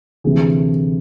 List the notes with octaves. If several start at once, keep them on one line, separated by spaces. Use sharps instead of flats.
D2 C3 E3 G#4